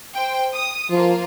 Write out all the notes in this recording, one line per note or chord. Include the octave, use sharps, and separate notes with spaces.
C5 G5
D#6
F3 A#3 F4